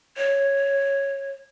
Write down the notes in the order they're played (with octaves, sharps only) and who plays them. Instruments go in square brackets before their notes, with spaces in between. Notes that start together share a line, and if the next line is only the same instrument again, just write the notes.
[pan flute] C#5